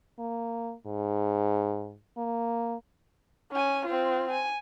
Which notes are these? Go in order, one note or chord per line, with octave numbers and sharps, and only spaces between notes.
A#3
G#2
A#3
C#4 G#5
C4 F4
G#5